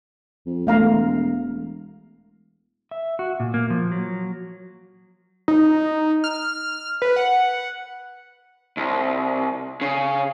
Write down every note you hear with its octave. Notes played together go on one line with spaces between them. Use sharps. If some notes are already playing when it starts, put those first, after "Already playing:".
F2
E1 A3 F5 A#5
E5
F#4
A#2
A#3
F3
F#3
D#4
F6
B4
F#5
C2
C#3